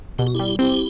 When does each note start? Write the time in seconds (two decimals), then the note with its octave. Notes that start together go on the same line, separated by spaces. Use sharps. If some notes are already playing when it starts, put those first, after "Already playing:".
0.19 B2 G4
0.27 F#4
0.35 G3 E4 G4
0.59 C4 E4 G4